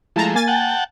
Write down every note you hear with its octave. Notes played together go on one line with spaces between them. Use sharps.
F3 G#3 A3 E4 A5 A#5
A#3 G#5 A6
F#5 G5 A5